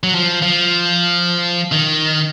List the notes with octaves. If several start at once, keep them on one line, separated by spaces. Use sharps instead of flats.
F#3
F3
F3
D#3